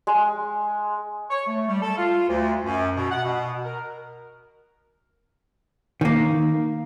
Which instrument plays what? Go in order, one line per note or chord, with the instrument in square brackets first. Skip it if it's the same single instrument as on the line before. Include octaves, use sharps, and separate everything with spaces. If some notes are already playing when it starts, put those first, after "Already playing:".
[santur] G#3
[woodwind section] C#5
A3
G3
A4
F4
D2
F#2
B2
F#5
B2
A#4
[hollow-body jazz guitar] D#3 A#3